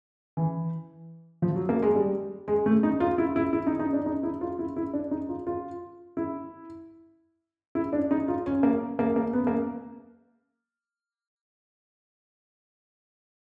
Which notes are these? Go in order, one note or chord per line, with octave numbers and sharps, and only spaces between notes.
E3
F3
F#3
A#3
G#3
G3
G#3
A3
D#4
F4
E4
E4
E4
D#4
D#4
D4
D#4
E4
F4
E4
E4
D4
D#4
F4
F4
E4
E4
D4
D#4
F4
C#4
A#3
A#3
A#3
B3
A#3